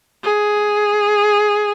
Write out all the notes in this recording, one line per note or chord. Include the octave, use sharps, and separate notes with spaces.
G#4